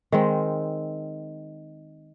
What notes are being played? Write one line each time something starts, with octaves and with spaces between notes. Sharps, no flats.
D#3 G#3 C4